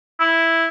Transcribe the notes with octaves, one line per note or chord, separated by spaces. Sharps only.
E4